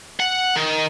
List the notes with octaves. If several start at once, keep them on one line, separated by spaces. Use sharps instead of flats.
F#5
D#3